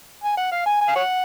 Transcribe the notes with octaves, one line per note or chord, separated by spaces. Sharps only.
G#5
F#5
F5
G#5
G#5
F5
C#5 F#5